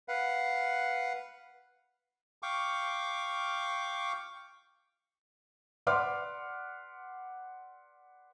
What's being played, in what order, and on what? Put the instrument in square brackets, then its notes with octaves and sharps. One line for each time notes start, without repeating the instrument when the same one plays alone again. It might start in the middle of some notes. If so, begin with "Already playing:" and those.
[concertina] B4 F5 F#5
[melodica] F5 G5 C#6 D6
[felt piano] B4 D5 F#5 C6 D6 F6